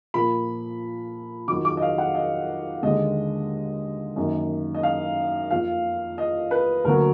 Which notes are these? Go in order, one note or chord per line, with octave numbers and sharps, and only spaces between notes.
A#2 F3 A#3 B5
F2 D#3 F#3 D6
D6
D#5
F5
F#5
D#5
D#2 D3 G#3 D#5
F#2 D#3 A#3
D#5
F5
F2 F3 A#3 F5
D#5
B4
D2 D3 F#3 A#3 A#4